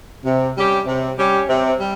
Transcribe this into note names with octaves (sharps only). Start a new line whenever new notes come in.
C3
G3 C#4 G4
C3
G3 C#4 G4
C3
G3